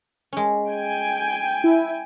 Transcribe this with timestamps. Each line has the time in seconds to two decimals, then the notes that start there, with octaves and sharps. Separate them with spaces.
0.33 G#3 C#4
0.70 G5 G#5
1.64 E4